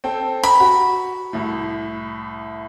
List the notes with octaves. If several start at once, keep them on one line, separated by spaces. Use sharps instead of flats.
C4 A4 G5
A#5 B5
F#4
C2 A2